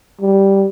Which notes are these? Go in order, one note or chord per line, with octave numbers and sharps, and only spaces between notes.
G3